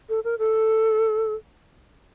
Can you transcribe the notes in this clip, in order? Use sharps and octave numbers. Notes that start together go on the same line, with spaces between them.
A4
A#4
A4